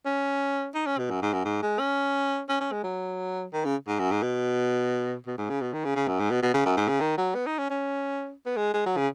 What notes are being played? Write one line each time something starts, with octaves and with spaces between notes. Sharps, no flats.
C#4
D#4
C#4
B2
F#2
G#2
F#2
G#2
G#3
C#4
C#4
C#4
G#3
F#3
D#3
C#3
G#2
F#2
G#2
B2
B2
G#2
C#3
B2
D#3
C#3
C#3
F#2
G#2
B2
B2
C#3
F#2
G#2
C#3
D#3
F#3
B3
D#4
C#4
C#4
B3
G#3
G#3
F#3
C#3